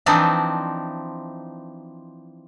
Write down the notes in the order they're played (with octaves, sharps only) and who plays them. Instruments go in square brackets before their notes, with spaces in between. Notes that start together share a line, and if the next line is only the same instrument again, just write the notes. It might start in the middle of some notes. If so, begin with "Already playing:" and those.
[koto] E3 F3 C4 D4 D#4